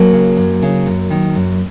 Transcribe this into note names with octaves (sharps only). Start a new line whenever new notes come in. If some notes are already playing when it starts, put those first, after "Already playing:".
Already playing: F#3 A#3
C#3
F#2
C#3
F#2
D#3
F#2